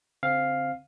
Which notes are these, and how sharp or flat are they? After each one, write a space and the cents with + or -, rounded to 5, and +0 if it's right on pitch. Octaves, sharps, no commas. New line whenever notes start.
D3 -30 C4 +0 F5 +5